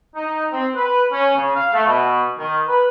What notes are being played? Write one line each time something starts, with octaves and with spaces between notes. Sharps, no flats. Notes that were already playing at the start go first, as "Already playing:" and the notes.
D#4
C4
B4
C#4
C#3
F5
A3
B2
D#3
B4